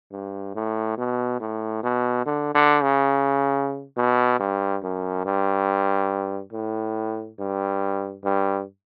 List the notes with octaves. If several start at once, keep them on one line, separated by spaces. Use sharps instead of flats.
G2
A2
B2
A2
B2
D3
D3
C#3
B2
G2
F#2
G2
A2
G2
G2